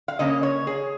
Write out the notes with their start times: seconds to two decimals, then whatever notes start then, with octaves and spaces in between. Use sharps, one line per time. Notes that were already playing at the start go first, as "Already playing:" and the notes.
0.08 F5
0.19 C#3 A#3 C#4 D#5
0.43 C#5
0.67 G#4